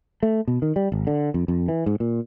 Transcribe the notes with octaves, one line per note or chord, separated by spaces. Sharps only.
A3
B2
D#3
G3
G#1
D3
F2
F2
E3
G#2
A#2